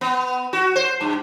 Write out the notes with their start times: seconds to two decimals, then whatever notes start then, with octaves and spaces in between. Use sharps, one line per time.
0.01 B3
0.53 F#4
0.76 C5
1.01 G2